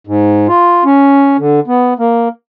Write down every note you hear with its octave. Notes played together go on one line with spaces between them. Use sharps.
G#2
F4
C#4
D3
B3
A#3